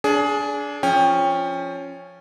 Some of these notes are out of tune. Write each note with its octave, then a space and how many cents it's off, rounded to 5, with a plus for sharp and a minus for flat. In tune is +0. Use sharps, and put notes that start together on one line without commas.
D4 -20 G#4 +15
F3 +0 C#4 +0 G5 +25